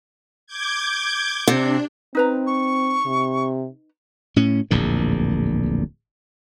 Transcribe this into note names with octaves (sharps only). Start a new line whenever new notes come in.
D6 G6 G#6
C3 D4
C4 D#4 B4 A#5
C#6
C3
A2 C#4
D1 A#1 E2 A#2